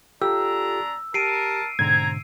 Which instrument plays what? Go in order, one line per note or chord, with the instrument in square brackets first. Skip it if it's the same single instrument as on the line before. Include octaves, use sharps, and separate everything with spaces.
[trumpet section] G#3 D4 A#5 [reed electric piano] F4 G4 A4 [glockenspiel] E6
[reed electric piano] G4 [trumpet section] A#4 A5 [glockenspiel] C7 D7 D#7
[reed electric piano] G#2 B2 D3 [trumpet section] C4 A#5 [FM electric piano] G#6